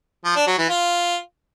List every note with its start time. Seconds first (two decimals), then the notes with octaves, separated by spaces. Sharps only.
0.25 F3
0.36 D4
0.47 F#3
0.58 E3
0.69 F4